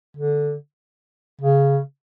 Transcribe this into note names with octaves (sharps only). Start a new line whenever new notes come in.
D3
C#3